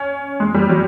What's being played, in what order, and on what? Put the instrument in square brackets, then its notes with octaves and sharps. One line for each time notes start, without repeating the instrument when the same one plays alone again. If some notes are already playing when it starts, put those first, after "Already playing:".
Already playing: [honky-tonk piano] C#4
G#3
G3
F#3